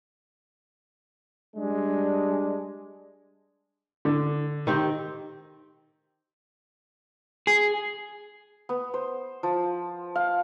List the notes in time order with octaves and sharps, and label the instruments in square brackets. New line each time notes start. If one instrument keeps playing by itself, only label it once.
[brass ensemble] G3 G#3 D4
[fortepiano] D3
[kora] D#3 C4 G4
[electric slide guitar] G#4
[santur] B3
C5
F3
F5